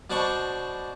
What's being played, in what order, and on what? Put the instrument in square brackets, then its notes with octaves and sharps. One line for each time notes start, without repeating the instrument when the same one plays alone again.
[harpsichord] B2 D4 C5 D5 A5 C#6